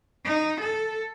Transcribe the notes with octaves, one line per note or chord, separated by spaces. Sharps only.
D#4
A4